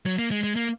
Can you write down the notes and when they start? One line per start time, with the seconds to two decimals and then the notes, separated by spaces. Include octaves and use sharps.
0.06 F#3
0.19 A#3
0.31 G#3
0.44 G#3
0.56 A#3